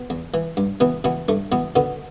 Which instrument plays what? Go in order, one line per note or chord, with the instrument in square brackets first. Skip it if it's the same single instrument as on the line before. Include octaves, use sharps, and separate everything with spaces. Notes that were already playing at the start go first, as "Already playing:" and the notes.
Already playing: [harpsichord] B2
E2
E3
G2
B2 E3 B3
B2 E3 B3
G2 A3
B2 E3 B3
B2 D3 B3